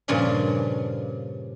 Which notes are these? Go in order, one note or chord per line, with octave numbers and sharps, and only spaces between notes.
G2 A#2 C#3 F3 D4